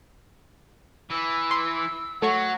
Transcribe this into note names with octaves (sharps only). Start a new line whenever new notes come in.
E3 E6
C6
F#3 A3 C#5 F#5 C#6